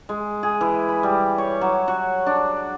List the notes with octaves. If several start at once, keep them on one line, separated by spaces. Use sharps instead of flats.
G#3
G#4
E3
B5
G3
C#5
F#3
F#4
D4